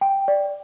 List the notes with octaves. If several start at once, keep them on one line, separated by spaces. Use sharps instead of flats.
G5
D5